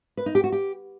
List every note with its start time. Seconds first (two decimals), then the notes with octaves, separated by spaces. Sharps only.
0.17 B4
0.26 D#4
0.35 G4
0.44 F#4
0.52 G4